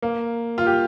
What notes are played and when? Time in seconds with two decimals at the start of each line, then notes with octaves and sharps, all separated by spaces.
0.02 A#3
0.58 F4
0.66 G4